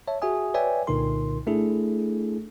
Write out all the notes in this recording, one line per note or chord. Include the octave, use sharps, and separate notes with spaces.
C#5 E5 A5
F#4 G#4 E5 G#5 D#6
B4 C#5 D5 E5 G5 G#5
C2 A#2 D3 D#4 A#4 C6
A3 D4 E4 G#4 A4